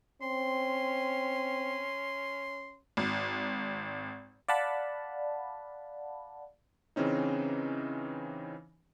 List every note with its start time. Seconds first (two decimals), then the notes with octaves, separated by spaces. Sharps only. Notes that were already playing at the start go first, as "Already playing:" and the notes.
0.22 C4 C#4 C6
2.97 G#1
4.48 D5 F5 F#5 A5 B5
6.96 C#3 E3 C4 C#4 D#4